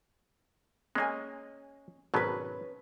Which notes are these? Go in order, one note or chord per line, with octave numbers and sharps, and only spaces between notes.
G#3 A#3 C#4 D#5 G#5
G#1 B2 F#3 C#4 B4